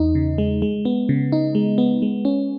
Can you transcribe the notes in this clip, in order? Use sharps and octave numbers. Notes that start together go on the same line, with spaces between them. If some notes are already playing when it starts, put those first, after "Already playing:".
Already playing: E2 D#4
C#3
G#3
G#3
B3
C#3
D#4
G#3
B3
G#3
C#4